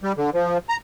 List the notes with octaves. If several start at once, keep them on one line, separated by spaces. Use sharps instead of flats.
G3
D3
F3
A#5